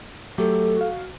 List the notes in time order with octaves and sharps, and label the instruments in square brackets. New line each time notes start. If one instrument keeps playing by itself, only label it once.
[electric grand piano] F#3 A3 G4 [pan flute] A4
[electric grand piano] F#4 F5